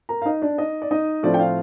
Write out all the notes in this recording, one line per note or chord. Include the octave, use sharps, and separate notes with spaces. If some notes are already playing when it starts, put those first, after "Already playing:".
A#4 A#5
F5
D#4 D#5
D4 D5
D#4 D#5
D5
D#4 D#5
A2 F3 C4 D4 D5
G5
F4 F5